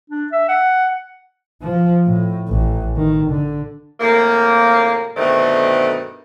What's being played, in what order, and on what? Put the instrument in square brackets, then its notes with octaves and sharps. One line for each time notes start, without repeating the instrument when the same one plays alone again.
[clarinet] D4
E5
F#5
[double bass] F3
A2
A1
D#3
D3
[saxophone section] A2 C3 F3 A#3
G2 B2 D3 D#3 A3 C4